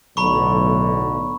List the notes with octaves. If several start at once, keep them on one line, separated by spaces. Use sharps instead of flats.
B1 A2 D3 A#5 B5 C#6